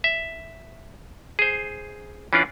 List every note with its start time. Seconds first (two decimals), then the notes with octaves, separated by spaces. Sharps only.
0.04 E5
1.39 G#4 C5
2.33 E3 C#4 D4 F4 D5